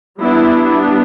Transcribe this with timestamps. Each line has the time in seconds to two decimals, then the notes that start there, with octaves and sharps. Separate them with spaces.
0.20 G3 B3 D4 E4